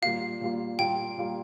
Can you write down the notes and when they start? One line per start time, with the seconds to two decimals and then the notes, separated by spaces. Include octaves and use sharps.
0.02 A#2 G3 A#3 F4 F5
0.41 A#2 G3 A#3 F4
0.78 A#2 G3 A#3 F4 G5
1.17 A#2 G3 A#3 F4